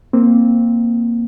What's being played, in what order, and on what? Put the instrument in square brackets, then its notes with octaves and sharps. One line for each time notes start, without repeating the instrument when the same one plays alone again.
[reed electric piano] A#3 C4